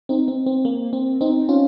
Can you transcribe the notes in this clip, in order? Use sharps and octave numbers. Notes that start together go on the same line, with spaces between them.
C4 D#4
C4
C4
A#3
C4
C4 D#4
C#4 F4